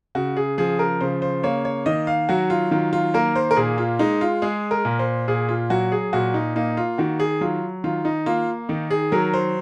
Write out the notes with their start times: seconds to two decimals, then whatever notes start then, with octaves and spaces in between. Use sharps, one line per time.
0.15 C#3 F#4
0.37 G#4
0.58 F3 G#4
0.79 A#4
1.01 C#3 C5
1.22 C5
1.43 A#3 C#5
1.65 C#5
1.86 D#3 D#5
2.07 F5
2.29 F#3 F#4
2.50 F4
2.71 D#3 F4
2.93 F4
3.14 A#3 A#4
3.35 C5
3.51 A#4
3.56 A#2 G#4
3.78 F4
3.99 G#3 D#4
4.21 F4
4.42 G#3 G#4
4.71 A#4
4.85 A#2
4.99 C5
5.28 A#2 G#4
5.49 F4
5.70 F#3 F#4
5.92 G#4
6.13 A#2 F#4
6.34 D#4
6.56 A#3 D#4
6.77 F4
6.98 D#3 F#4
7.20 G#4
7.41 F#3 F4
7.84 D#3 F4
8.05 D#4
8.26 A#3 F4
8.69 D#3 D#4
8.91 G#4
9.12 F#3 A#4
9.34 C5